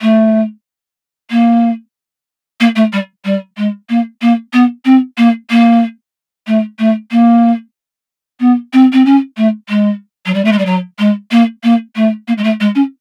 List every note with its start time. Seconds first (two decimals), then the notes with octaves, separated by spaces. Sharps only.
0.01 A3
1.30 A#3
2.60 A#3
2.75 A3
2.92 G3
3.24 G3
3.57 G#3
3.89 A#3
4.21 A#3
4.53 B3
4.85 C4
5.17 A#3
5.50 A#3
6.47 A3
6.79 A3
7.11 A#3
8.40 B3
8.73 C4
8.92 C4
9.05 C#4
9.37 A3
9.69 G#3
10.26 F#3
10.34 G3
10.44 A3
10.52 G#3
10.58 G3
10.65 F#3
10.98 G#3
11.31 A#3
11.63 A#3
11.95 A3
12.27 A#3
12.37 G#3
12.43 A3
12.60 G#3
12.75 C#4